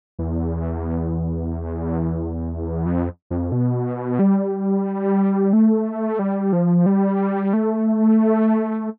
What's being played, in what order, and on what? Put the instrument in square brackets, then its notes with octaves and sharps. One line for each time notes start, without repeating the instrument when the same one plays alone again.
[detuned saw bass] E2
F2
F2
B2
G3
A3
G3
F3
G3
A3